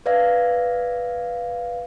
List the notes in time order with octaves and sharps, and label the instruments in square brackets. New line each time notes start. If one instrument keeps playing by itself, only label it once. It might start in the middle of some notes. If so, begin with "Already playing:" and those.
[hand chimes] B4 D5 E5 F5